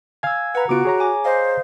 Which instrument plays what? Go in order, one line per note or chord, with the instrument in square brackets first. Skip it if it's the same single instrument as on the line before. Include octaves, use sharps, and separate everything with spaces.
[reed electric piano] F5 G#5 [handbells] E6 G#6
[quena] B4 [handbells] F#5 A#5
[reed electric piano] C#3 B3 F4 [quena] F#4 [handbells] D6 D7
[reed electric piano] G#4 C#5 A#5
[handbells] G#5 D6
[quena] C5 [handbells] D#5 F5